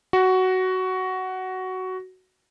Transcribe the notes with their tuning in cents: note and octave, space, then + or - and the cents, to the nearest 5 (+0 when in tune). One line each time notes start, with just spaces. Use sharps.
F#4 +10